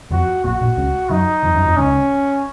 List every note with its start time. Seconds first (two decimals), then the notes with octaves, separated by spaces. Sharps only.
0.11 F2 F3 F#4
0.44 A#1 A#2 F#4
0.61 A#1 A#2
0.77 C#2 C#3
1.10 F#2 F#3 D#4
1.43 F2 F3
1.54 F#2 F#3
1.65 F2 F3
1.76 C#2 C#3 C#4